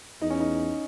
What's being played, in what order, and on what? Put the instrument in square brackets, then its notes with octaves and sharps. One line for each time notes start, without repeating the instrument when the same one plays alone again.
[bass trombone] E2 [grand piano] D#4
[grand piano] C#4
D#4